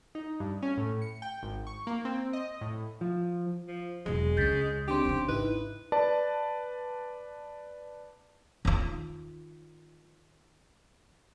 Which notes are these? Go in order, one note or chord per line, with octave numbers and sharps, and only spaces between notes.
D#4
G2
C#4
A2
C#7
G5
G#1
C#6
A#3
C4
D#5
A2
F3
F3
E1 E2 F#3 G#3
C#2 C#3 C#4 G6 A6 B6
D3 D#3 C4 D4 G4 C6
D#2 C#3
G#1 D#4 E4 B4
B4 D5 A5
D#3 F4